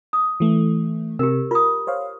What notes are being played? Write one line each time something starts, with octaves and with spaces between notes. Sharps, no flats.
D#6
E3 A3
C3 G4 A#4
F4 A#4 D#6
C5 C#5 F5